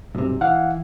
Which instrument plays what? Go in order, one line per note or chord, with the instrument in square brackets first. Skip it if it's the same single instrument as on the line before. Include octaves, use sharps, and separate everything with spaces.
[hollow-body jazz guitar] B1 G2 C3
[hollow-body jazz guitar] E3 [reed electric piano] F5 F#5